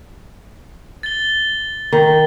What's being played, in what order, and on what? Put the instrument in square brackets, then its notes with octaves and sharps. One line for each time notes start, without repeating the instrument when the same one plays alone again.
[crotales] A6 G7
[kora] D#3